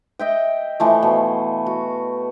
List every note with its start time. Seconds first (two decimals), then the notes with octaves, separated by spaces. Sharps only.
0.19 D#5 E5 G5
0.80 E3 F3 A3
1.02 B2
1.66 F#4